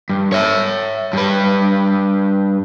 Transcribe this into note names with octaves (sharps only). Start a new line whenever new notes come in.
G2
C#5 E5
G2 B4